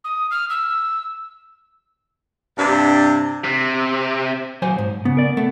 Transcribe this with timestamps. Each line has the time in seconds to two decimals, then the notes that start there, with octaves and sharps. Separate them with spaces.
0.04 D#6
0.31 F6
0.50 E6
2.57 G2 C3 D4
3.44 C3
4.62 F#3 C5 G#5
4.78 G#2
5.05 C#3 B3
5.17 A#4 D5
5.37 A3 B3